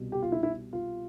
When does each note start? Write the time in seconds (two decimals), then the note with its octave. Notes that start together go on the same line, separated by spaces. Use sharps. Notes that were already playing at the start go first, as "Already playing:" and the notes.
Already playing: C2 B2 G3
0.12 G4
0.23 F4
0.32 E4
0.43 E4
0.73 F4